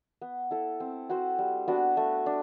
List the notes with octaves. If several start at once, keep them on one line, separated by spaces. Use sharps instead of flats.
B3
E4 A4
C4
F#4 C5
G3
B3 D4 F#4
A3
D4